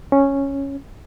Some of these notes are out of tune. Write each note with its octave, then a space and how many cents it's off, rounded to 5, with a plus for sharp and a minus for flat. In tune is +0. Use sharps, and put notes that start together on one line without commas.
C#4 -5